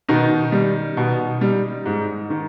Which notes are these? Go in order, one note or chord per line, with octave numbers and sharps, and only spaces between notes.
B2 D#3 D#4
G3
B2
G3
G#2
D#3